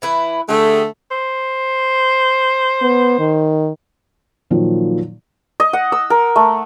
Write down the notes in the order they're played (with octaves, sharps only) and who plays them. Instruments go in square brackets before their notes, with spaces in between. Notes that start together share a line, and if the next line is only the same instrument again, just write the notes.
[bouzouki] E3 E4 B4
[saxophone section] D3 A3 [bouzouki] G4 G#4
[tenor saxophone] C5
[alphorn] B3
D#3
[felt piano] A#2 D#3 F3 F#3
[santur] D#5
F#5
E6
A#4
A3